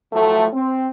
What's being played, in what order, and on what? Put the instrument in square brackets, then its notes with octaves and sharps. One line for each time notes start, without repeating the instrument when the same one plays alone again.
[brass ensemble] A2 F3 F#3 A3
C4